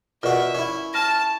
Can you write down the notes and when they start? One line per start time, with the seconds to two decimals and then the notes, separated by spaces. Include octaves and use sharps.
0.23 B2 F4 F#4 A#4 D5 E5
0.55 C#4 E4
0.94 A5 F6 A#6